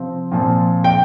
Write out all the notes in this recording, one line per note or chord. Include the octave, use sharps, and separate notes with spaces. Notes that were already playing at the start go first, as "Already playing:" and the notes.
Already playing: C3 F3 C4
A#2 F3 C4
G5